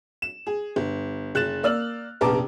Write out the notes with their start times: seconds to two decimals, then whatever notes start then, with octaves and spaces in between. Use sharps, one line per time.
0.22 E7
0.46 G#4
0.76 G1
1.35 F#1 F#6 A6 E7
1.63 A#3 D5 E6 F6 F#7
2.21 F1 A#1 B3 A5 A#5 D6